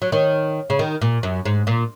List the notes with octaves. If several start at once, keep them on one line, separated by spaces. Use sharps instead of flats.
F#3
D#3
C#3
D#3
A#2
F#2
G#2
A#2